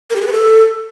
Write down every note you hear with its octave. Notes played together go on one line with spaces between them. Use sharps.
A#4
G4
G#4
B4
A4